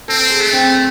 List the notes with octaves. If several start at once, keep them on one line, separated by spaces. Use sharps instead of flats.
C4 A4
G#4
A3
C4